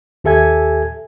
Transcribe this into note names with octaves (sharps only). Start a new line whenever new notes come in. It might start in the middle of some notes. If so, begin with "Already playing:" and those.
D#2 G4 A4 E5 G#5 G#6